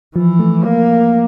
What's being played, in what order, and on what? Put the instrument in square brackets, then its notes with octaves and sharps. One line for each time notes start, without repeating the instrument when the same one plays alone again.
[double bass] E3 [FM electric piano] F3
[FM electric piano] A3
[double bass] A#3